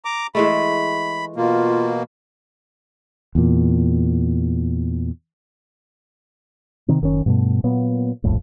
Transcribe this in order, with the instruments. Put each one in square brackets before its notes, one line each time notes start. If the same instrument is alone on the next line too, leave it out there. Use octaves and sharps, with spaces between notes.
[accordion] A#5 D6
[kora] E3 G#3 A3 [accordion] B5
[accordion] B2 A#3 [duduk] F4
[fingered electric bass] E2 A#2
C3 D#3 C4
F#1 D#3 C4 C#4
G2 B2 A3
A#2 F#3 A#3 B3
D#1 A#1 F2 A2